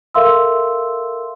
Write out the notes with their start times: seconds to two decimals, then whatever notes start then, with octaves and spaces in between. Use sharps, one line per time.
0.15 A4 A#4 E5 F5 C6 E6